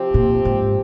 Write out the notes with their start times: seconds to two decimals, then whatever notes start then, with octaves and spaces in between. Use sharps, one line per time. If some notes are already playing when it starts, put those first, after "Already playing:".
Already playing: C3 F3 C4 G4
0.14 A#2
0.45 G#2